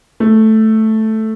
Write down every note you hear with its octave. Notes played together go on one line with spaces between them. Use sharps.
A3